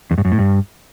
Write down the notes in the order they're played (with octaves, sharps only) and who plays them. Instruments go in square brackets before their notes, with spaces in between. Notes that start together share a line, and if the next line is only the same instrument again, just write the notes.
[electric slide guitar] E2
G2
F#2
A2
G2